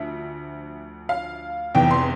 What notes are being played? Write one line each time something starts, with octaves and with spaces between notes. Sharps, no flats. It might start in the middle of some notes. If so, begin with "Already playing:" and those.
Already playing: D2 D3 F3 E5
F5
F1 E2 C3 E3 G5
C6